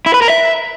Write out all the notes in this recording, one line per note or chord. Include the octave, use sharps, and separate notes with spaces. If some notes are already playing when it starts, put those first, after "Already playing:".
E4
B4
A#4
E5